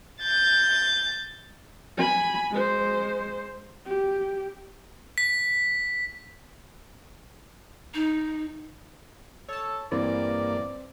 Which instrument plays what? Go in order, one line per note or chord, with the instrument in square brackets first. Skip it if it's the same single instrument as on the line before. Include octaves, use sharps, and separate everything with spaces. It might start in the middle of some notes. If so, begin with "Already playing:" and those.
[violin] G6 A6
[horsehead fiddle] G#5 B5
G#3 C5
G4
[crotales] B6
[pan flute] D#4
[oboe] A4 [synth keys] C#5 A5
[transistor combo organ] G2 A#3 [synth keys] E3 [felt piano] C4 [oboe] D5